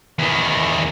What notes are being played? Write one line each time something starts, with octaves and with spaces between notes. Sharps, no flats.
E2 D#3